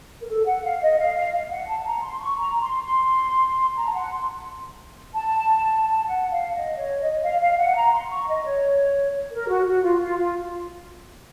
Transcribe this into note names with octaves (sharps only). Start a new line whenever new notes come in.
A#4
A4
F#5
F5
D#5
F5
F5
F5
F#5
A5
A#5
C6
C#6
A#5
C6
C6
A#5
A5
F#5
C6
A5
A5
F#5
F5
D#5
C#5
D#5
F5
F5
F#5
A#5
C6
C#6
D#5
C#5
A#4
F#4
F#4
F4
F4
F4